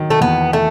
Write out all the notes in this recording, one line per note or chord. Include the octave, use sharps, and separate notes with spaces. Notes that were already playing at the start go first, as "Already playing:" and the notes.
Already playing: D#3 F#3
A3
E2 B3
A3